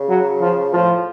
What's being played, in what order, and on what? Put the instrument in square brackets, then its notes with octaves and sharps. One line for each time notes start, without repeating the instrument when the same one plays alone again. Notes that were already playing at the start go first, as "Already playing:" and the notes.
Already playing: [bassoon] C#3
[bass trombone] F#3
F3
[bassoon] A2 [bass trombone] F3